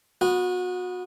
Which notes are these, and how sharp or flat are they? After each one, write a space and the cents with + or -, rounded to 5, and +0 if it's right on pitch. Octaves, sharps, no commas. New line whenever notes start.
B3 +0 F#4 -30